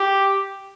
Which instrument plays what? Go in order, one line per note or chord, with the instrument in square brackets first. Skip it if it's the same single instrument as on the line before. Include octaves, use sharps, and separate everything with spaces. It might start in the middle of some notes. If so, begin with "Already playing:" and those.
Already playing: [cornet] G4